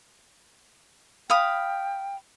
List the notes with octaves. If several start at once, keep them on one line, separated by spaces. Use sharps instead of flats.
F5 G5 B5 D#6